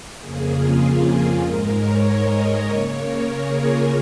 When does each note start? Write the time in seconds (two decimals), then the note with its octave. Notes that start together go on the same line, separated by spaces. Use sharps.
0.18 F2 C#3 A#3 G#4
0.49 F4
1.42 G#2 G#3 A#4
1.73 C#5
2.04 D#5
2.36 C#5
2.66 C#3 A#3
2.98 A#4
3.29 G#4
3.59 F4